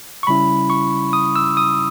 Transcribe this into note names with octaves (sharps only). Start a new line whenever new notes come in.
C#6
C#3 G3 C#4 E4 B5
C#6
D#6
E6
D#6